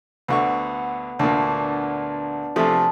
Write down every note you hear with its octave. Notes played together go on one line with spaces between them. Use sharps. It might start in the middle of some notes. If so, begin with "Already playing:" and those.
D2 D3 B3 F#5 C#6
D2 A#2 D4
C3 F3 A3 G#4 A4